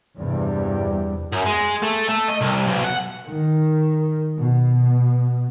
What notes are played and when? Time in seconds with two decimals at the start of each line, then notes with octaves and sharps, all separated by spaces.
0.18 E2 G2 C3 G3
1.33 F#2
1.46 G#3
1.83 A3
2.09 A3
2.29 D#5
2.42 C2
2.68 B1
2.84 F#5
3.27 D#3
4.37 B2